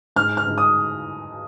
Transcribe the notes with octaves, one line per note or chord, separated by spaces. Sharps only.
G#2 F6
F6
G#2
D#6